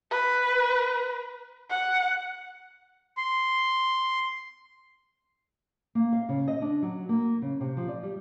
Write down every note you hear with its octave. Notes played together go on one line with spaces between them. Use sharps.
B4
F#5
C6
A#3
F5
C#3
D#5
D4
F#3
A#3
C#3
C3
F3
D5
G3